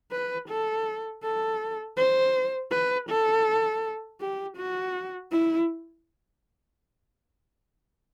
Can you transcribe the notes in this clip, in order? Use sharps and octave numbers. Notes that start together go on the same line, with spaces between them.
B4
A4
A4
C5
B4
A4
G4
F#4
E4